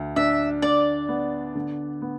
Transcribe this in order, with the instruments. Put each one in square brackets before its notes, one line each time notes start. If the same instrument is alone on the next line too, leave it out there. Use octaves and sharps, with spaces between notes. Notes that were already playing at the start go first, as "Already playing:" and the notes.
Already playing: [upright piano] D2
[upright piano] D4 [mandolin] E5
[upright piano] D3 [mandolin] D5
[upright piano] B3
D3
B3